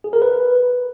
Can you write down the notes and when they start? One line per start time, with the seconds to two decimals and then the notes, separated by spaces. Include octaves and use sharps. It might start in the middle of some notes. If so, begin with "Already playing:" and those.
0.04 G#4
0.13 A#4
0.22 B4